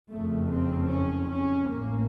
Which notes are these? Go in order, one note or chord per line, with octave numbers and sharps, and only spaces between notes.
F#1 F2 C#3 A3
C4
C#4
C#4
A1 A2 A#3